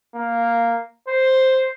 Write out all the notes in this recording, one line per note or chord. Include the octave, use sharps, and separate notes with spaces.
A#3
C5